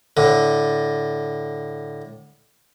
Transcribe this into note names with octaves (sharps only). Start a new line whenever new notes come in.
A2 D3